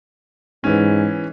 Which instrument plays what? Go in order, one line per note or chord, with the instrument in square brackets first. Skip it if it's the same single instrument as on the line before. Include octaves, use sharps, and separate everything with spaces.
[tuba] G#2 [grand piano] E3 C#4